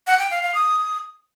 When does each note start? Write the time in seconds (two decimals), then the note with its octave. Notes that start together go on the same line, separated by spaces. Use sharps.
0.07 F#5
0.19 G5
0.31 F5
0.43 F5
0.55 D#6